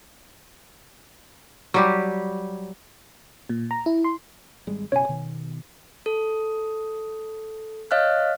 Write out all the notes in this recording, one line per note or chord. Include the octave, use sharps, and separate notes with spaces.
F#3 G3 G4
A#2
A#5
E4
C6
G#1 G3 G#3
F#1 B2 C#4 C#5 G#5
B2 D#3
A4
C#5 D#5 F5 F6 F#6